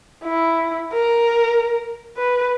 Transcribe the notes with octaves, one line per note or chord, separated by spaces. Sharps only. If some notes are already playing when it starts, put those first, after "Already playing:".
E4
A#4
B4